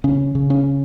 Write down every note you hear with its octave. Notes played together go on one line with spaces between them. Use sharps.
C#3 C#4
C#3
C#4